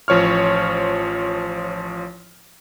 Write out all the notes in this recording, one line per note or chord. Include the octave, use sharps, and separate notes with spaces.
A1 F3 C#5 C#6 F6